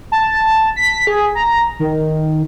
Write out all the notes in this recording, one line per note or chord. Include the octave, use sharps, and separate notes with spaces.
A5
B6
G#4
A#5
D#3